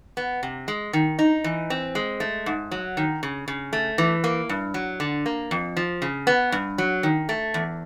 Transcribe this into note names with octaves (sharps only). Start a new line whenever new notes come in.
B3
C3
G#3
D#3
D#4
E3
C4
G#3
A3
G#2
F#3
D#3
C#3
C#3
A3
E3
A#3
G2
F#3
D3
A#3
F2
F3
C#3
B3
G2
F#3
D#3
A3
E2